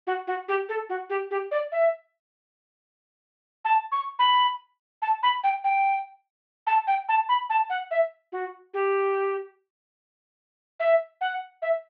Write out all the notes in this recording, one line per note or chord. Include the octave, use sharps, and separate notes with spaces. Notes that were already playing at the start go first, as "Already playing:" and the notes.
F#4
F#4
G4
A4
F#4
G4
G4
D5
E5
A5
C#6
B5
A5
B5
G5
G5
A5
G5
A5
B5
A5
F#5
E5
F#4
G4
E5
F#5
E5